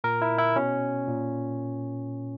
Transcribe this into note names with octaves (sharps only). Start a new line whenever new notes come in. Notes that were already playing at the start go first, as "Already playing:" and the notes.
A#2 A#4
E4
E4
B2 C#4
A#2